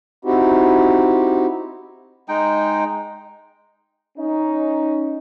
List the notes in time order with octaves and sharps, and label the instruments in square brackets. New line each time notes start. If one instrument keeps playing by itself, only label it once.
[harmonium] C4 D#4 E4 F#4 G4
[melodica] G#3 D#4 G5
[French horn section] C#4 D#4